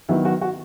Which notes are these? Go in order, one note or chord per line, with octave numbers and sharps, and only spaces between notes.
D#3 F#3 B3 E4
F#4
F#4